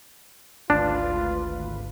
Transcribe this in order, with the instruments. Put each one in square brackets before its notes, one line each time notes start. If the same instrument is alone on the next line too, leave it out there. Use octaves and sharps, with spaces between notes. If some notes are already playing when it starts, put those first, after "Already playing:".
[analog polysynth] G#1 D2 B4 [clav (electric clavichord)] D4 [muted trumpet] F4